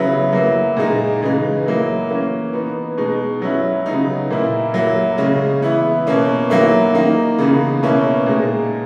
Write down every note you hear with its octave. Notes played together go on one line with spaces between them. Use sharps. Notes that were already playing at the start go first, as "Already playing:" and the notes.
Already playing: C#3 F#3 B3 E4
F#3 A#3 E4
A#2 G#3 D#4
C#3 E3 G#3 D#4
F#3 A#3 E4
E3 A#3 C#4
E3 B3 D#4
B2 G#3 D#4
F#3 C#4 E4
C#3 F#3 B3 D#4
A#2 A#3 E4
F#3 A#3 E4
C#3 G#3 C#4
E3 B3 E4
B2 A#3 C#4
D#3 F#3 A#3 E4
D#3 A#3 D#4
C#3 E3 B3 D#4
B2 A#3 C#4 E4
A#2 G#3 D#4